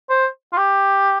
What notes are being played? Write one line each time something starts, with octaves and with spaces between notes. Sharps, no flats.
C5
F4
G4